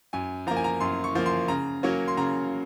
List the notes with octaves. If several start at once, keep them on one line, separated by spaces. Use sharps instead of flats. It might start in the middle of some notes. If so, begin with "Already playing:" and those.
F#2 G#5
F3 A#3 A#5
G#5
A#5
F#2 C6
C#6
F3 A#3
C6
C#3 A#5
F#3 A#3 C#4
C6
C#3 A#5